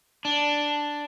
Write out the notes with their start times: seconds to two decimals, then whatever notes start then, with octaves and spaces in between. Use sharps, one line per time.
0.25 D4